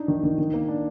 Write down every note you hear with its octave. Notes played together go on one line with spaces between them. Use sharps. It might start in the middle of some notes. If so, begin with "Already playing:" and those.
Already playing: D4 D#4
D#3
D#3
D#3
A#3
D4